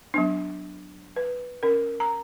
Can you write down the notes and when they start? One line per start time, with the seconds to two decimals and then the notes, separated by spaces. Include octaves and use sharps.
0.14 F#3 B3 D4
1.16 B4
1.63 C#4 A#4
2.00 A#5